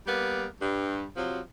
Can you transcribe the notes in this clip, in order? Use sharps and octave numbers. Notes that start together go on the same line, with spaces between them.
G3 A#3 B3
G2
C3 F3 F#3